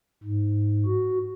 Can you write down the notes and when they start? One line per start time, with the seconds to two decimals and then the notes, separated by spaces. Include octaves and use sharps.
0.24 G#2
0.86 F#4